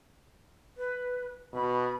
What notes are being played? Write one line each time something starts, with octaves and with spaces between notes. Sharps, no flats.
B4
B2 B5